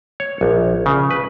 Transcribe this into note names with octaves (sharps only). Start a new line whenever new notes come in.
C#5
A#1
C#3
B4